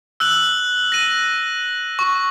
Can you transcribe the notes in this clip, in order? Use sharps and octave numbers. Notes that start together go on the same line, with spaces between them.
E6 F#6 F#7
A#6 D#7
C#6